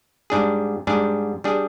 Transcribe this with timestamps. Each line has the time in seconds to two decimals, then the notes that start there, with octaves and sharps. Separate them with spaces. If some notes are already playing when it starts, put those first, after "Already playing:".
0.30 G#2 G3 D4 G#4
0.87 G#2 G3 D4 G#4
1.44 G3 D4 G#4